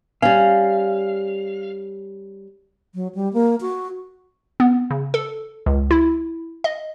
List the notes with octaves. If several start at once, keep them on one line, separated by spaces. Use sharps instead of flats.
G3 C#4 F5
F#3
G3
A#3
F#4
B3
C#3
A4
C#2
E4
D#5